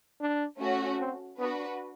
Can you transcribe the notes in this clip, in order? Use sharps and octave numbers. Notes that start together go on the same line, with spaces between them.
D4
A3 C#4 F#4
C4
B3 D4 F#4 B4